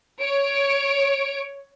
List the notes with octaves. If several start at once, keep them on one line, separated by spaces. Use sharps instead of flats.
C#5 D7